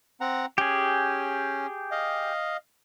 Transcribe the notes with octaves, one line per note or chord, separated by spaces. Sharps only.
C4 F#5 A#5
C#4 G4 G#4
D#5 F5